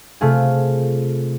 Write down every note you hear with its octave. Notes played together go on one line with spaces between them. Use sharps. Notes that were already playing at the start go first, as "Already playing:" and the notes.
C3 A3 F4 G#4